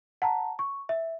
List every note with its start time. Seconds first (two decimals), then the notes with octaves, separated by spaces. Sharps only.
0.22 F#5 A5 A#5
0.59 C#6
0.89 E5